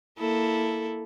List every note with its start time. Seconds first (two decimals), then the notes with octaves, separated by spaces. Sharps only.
0.19 A#3 E4 A4